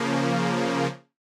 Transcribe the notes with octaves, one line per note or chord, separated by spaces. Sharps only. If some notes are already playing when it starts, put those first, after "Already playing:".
Already playing: C#3 F3 A#3